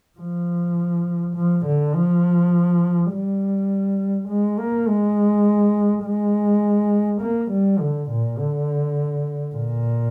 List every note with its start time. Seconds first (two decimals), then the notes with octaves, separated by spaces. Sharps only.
0.19 F3
1.36 F3
1.66 D3
1.95 F3
3.12 G3
4.29 G#3
4.59 A#3
4.88 G#3
6.05 G#3
7.21 A#3
7.51 G3
7.80 D3
8.10 A#2
8.38 D3
9.56 A#2